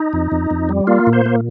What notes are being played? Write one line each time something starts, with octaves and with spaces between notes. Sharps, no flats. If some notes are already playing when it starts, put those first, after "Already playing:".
Already playing: D#4
F2
F2
F2
G3
A#3 F4
A#2
C5
A#3